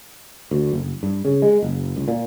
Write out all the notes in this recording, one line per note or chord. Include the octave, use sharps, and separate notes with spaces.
D2
F#1
G2
C#3
G#3
F#1
C#2
A#2